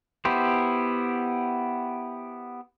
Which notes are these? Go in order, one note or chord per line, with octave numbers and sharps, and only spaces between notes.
B3 E4 G4 C5